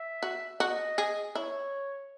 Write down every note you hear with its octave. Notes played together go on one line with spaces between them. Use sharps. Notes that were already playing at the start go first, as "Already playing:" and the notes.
Already playing: E5
F#4
F#4 D#5
G#4
E4 C#5